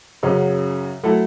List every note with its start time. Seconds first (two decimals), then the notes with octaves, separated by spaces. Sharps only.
0.23 F#2 C#3 F#3 C#4
1.03 F#3 A3 E4 A4